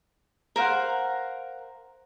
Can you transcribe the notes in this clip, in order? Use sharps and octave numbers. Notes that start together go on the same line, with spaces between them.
A#4 C5 F5 F#5